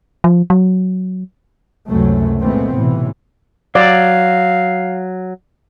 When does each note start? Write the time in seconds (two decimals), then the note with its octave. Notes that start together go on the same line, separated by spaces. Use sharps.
0.24 F3
0.50 F#3
1.88 C#2 F#2 C3 F#3 A3
2.41 A#2 E3 G#3 A3 B3 C4
2.75 B1 A2 C3 E3
3.75 F#3 D5 F5